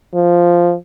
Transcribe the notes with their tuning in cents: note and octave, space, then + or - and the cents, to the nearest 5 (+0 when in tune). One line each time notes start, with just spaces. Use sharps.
F3 -5